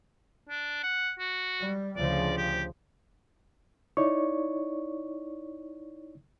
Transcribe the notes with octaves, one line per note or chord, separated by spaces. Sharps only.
D4
F#5
F#4
G3
D2 C#3 F3 D5
G4
D#4 E4 C#5 D5 C#6